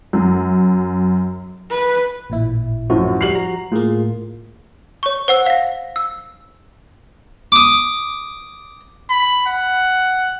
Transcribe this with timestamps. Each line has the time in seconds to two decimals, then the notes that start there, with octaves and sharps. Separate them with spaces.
0.13 F#2
1.70 B4
2.30 A1 A#2 E4
2.90 F#2 A2 F3 F#4
3.21 G3 F6 C7 F#7
3.35 A#5
3.72 A2 A#3 F4 G#4
5.03 C#5 C#6
5.28 C5 F#5 E6
5.46 F5 A#6
5.96 E6
7.52 D6 D#6
9.10 B5
9.47 F#5